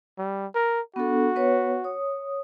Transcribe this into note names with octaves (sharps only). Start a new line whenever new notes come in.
G3
A#4
B3 D4 F#4 A4
B3 B4 C#5
C#5 D#6